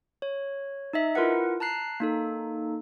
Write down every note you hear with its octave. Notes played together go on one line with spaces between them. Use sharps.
C#5
D#4 D#5 E5
E4 F4 A#4 B4 F#5
A5 A#5 F#6 C7
A#3 D#4 A4